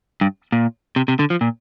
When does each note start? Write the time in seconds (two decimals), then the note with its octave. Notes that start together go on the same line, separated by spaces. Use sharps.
0.21 G2
0.52 A#2
0.96 C3
1.08 C3
1.19 D3
1.30 F3
1.41 A#2